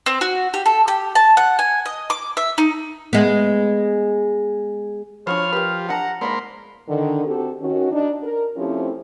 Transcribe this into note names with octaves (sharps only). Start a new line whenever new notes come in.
C4
F#4
G4
A4
G4
A5
F#5
G#5
D#5
D6
E5
D#4
G#3 B3
F3 D4 F#4 C5 C#5 B5 F6
G4 A#4 B4
D4 D#5 F#5 A5 A#5
G#2 F3 G#3 A#3 C#5 D5 B5 C6
D3 D#3
C4 F#4 G4 A4
D#3 C#4 F#4
D4 D#4
A#4
F3 A3 C4 C#4 E4 G4